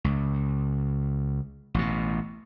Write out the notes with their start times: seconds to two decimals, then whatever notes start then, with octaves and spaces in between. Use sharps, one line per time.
0.04 C#2
1.74 A1 B2